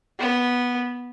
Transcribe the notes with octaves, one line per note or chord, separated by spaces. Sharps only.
B3